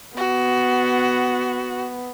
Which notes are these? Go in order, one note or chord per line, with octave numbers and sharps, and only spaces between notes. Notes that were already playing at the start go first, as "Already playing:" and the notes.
B3 F#4